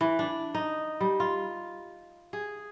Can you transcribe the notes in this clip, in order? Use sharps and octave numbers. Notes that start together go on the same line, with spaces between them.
E3
D4
D#4
G3
F4
G#4